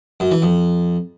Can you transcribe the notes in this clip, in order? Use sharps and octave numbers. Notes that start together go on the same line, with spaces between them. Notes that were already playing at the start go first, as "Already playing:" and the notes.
F#2
E3
F2